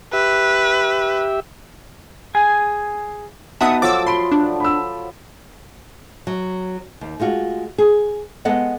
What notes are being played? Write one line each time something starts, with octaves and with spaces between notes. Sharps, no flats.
G4 B4 E5
G#4 G#5
B3 D#4 F#4 E5 F#5 A5 D#6
F3 F#3 A3 D6 E6 A6
B5 C6 D7
D4
B5 E6
F#3
D#2
G#3 A3 F4 F#4
G#4
G#3 B3 A4 D#5 F#5